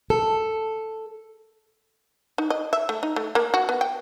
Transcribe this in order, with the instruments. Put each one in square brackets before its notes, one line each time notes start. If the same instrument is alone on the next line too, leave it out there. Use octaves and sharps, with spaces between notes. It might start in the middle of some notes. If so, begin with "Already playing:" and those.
[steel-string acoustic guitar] A4
[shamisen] D#4
D#5
E5
A3
D#4
A3
A#3
F#4
B3
G5